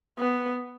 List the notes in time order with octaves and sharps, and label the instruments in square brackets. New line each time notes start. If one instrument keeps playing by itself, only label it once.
[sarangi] B3